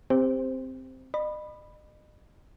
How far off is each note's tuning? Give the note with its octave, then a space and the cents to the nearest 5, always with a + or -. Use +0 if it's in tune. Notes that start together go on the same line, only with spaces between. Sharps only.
C4 +0 G4 +20 C5 +0
D#5 -40 B5 +0